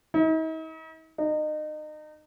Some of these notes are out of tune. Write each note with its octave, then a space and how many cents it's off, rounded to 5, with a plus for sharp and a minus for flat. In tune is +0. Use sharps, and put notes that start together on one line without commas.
D#4 +45
D#4 -30